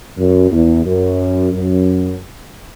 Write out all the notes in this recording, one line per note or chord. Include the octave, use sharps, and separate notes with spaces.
F#2
E2
F#2
F#2